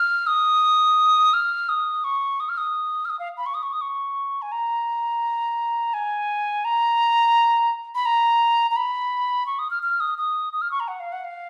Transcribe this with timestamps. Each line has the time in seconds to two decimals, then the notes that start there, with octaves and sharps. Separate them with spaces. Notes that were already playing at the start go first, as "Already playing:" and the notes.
Already playing: F6
0.27 D#6
1.33 F6
1.69 D#6
2.04 C#6
2.40 D#6
2.49 F6
2.58 D#6
3.05 F6
3.10 D#6
3.19 F5
3.37 B5
3.46 C#6
3.54 D#6
3.63 C#6
3.73 D#6
3.81 C#6
4.42 G#5
4.52 A#5
5.94 G#5
6.64 A#5
7.95 B5
8.05 A#5
8.71 A#5
8.76 B5
9.46 C#6
9.59 D#6
9.70 F6
9.83 F6
10.00 D#6
10.18 D#6
10.53 D#6
10.61 F6
10.71 C#6
10.80 A#5
10.88 F#5
11.00 F5
11.12 F#5
11.24 F5